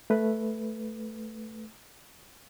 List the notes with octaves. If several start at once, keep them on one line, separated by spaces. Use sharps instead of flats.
A3 B4